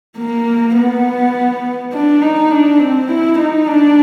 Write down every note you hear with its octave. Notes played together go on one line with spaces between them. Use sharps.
A#3
B3
D4
D#4
D4
C4
E4
D#4
D4